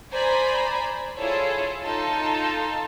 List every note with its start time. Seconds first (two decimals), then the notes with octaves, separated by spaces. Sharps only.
0.12 C5 D5 G#5 A#5 B5
1.17 E4 F4 G#4 A4 C#5
1.84 D#4 F4 A4 A5